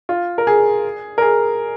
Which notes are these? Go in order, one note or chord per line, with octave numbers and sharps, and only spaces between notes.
F4
A#4
G#4
A#4
G#4